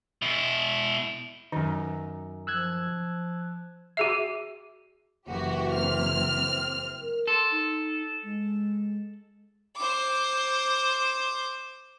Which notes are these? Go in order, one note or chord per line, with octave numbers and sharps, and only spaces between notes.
B2 E4
F#2 D#3 D#4
F3 E6 F#6 G#6
F#4 G#4 E5
F#1 E3 F#4 G4
C4 F6
A#4
A4 C6
D#4
G#3
C5 D6